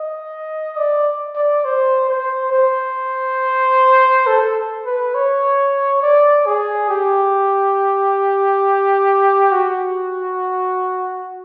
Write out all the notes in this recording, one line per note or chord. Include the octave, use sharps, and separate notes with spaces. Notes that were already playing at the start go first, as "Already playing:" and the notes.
Already playing: D#5
D5
D5
C5
C5
C5
A4
B4
C#5
D5
G#4
G4
F#4